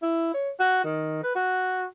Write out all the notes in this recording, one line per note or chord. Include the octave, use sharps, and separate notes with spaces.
E4
C#5
F#4
D#3
B4
F#4